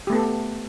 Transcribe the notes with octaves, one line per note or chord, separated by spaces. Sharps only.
A3 B3 G4 A4